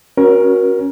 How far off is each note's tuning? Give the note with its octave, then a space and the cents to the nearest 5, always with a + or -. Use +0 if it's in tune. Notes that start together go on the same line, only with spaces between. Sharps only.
C#4 +0 F#4 -5 A#4 +25